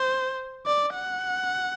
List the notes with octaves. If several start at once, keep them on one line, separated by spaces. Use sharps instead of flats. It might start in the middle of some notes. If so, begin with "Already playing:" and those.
Already playing: C5
D5
F#5